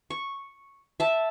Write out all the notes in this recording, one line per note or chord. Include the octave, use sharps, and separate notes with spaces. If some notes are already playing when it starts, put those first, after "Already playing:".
C#6
E5 A5